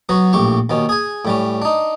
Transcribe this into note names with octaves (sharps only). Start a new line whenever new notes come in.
F#3 B3 F#4
A#1 A2 G4 C#6
D#2 B2 C#4
G#4 G#5
A2 G3 C#4
D4 D#4